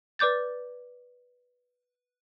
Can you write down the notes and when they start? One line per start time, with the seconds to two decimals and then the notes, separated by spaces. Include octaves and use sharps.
0.19 B4 D5 D6 G6 A6